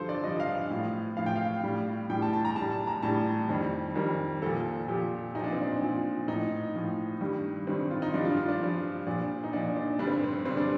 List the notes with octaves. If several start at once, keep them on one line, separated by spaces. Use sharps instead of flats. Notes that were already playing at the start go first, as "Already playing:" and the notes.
Already playing: G2 D3 F3 A4 C5
D5
G2 D3 F3 D#5
F5
F5
A2 F3
A2 F3 F5
G5
F5
A2 G3
A2 G3 G5
A5
A5
A#5
A2 G3 A5
A5
A#5
A2 G3 A5
F2 D#3 G3
F2 D#3 G3 A#4
A#2 F3 A4
A#2 F3 G4
A#2 F3 D4 D#4
C4
D4
A#2 F3
A2 F3 D#4
A2 F3
G2 D#3 G3
G2 D#3 G3 C4
F4
D#4
G2 F3 D4
F4
F4
D4
G2 F3
A#2 F3 D4
D#4
A#2 F3 D4
D4
G2 D3 G3 D4
C4
C4
G2 D3 G3 C4
D4